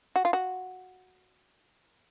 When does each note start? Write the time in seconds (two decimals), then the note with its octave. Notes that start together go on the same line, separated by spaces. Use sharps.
0.16 F#4
0.25 F4
0.33 F#4